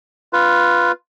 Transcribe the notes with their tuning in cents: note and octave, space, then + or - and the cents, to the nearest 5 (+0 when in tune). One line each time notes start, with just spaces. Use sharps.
F4 +0 B4 +0